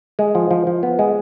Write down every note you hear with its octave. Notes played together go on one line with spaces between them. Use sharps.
G#3
F3
F3
F3
B3
G#3